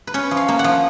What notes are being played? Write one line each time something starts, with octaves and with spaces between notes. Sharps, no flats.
B4
C#4 C#5
F3
F5
A#3
F#5
F3